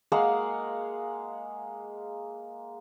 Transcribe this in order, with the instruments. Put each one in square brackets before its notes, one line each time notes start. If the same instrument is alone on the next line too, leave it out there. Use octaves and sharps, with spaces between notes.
[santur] G#3 A#3 F5 F#5